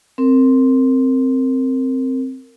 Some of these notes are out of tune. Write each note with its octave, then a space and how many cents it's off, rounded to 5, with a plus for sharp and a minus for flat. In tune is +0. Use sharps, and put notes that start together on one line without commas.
C4 +0 A#4 -15